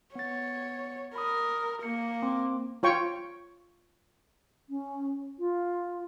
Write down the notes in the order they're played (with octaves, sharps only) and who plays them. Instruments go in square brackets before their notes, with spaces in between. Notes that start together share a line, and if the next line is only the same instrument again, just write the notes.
[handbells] B3 A6 [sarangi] C#5
[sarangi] A#4 [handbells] B5 D#6
[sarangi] A#3 [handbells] C#7
[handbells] C4 C6 D6
[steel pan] F4 C#5 G5 C#6
[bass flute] C#4
[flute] F4